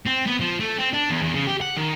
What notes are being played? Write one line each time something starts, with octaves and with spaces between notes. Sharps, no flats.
C4
B3
F3
A3
C4
D4
E2
E2
C#3
G4
F#5
D#3